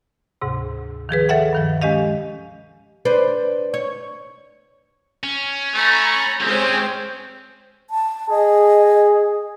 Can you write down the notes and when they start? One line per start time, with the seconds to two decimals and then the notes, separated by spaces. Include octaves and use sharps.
0.42 D2 G#2 C3
1.09 D#3 F3 G#4 B4
1.29 A4 C#5 E5 F#5 G5
1.53 G2 D#3 F3
1.81 G#3 C#4 G4 D#5 F5
3.05 D4 B4 C5
3.74 C#5
5.23 C#4
5.74 A3 A#5 B5
6.41 G#3 C4 C#4 G4 G#4 C5
7.90 A5
8.30 G#4 D#5